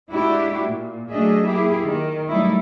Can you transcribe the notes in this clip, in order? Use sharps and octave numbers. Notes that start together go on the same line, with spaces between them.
G#3 D4 E4 F#4 G4
A#2
F#3 A3 D4 G#4 D#5 E5
A#3 E4 G4 G#4
D#3
F#3 G3 A3 D#4 E4